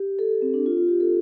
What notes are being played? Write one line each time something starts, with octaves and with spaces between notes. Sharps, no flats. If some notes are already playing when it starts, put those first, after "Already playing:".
Already playing: G4
A4
C4
D4
F4
F4
G4
A4